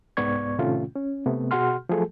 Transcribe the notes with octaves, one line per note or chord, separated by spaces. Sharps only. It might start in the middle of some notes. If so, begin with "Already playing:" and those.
C2 G#2 B3 D5 C#6 G#6
A2 C3 D#3 A3 C#4 F4
C#4
C3 A3 B3
B2 F#4 G#4 F#5 C6 F6
F3 F#3 A3 G#4 A4